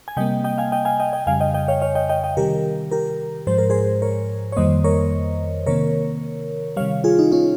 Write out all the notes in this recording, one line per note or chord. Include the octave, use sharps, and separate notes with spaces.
G#5
C3 G3 A#3 D#5 G5
D#5 G5
F5 G#5
D#5 G5
F5 G#5
D#5 G5
D#5 G5
F2 C#3 G3 F5 G#5
D#5 G5
D#5 G5
C#5 F5
C#5 F5
D#5 G5
D#5 G5
D#5 G5
C3 D#3 G3 G4 A#4
G4 A#4
G#2 F3 G#3 C5
A#4
G#4 C5
A#4 C#5
C#5
F2 D#3 G3 A#3 C5 D#5
A#4 C#5
C3 D#3 A#3 A#4 C#5
C3 D#3 G3 C#5 F5
F4 G#4
D#4
C#4 F4